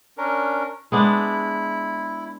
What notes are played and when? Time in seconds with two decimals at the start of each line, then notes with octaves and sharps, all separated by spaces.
0.17 C#4 D4 A#4
0.92 G#3 B3 D4 E4